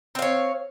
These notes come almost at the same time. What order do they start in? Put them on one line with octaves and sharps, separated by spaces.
C4 F5 C#5